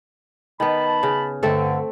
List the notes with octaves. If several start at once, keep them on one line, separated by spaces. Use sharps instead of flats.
D#3 B3 A5 B5
C#3
G2 D3 A3 C4 A4